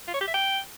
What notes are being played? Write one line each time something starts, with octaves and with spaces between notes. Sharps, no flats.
F4
C#5
G4
E5
G5